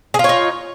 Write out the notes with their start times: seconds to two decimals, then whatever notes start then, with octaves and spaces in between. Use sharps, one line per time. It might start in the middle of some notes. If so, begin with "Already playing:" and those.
0.14 G#4
0.19 F4
0.24 C#5
0.29 D#4